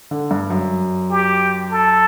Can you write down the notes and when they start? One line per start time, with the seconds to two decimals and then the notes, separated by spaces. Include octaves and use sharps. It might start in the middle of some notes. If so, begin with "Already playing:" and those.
0.11 D3
0.31 G2
0.50 F#2
1.11 G4
1.71 A4